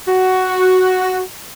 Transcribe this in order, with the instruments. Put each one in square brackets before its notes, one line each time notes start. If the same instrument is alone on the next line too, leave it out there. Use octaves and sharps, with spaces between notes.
[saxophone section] F#4